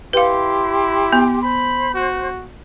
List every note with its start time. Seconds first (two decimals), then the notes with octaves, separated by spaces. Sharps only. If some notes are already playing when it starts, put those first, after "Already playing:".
0.13 E4 G4 B4 F5 C6
1.12 B3
1.43 C5 B5
1.94 F#4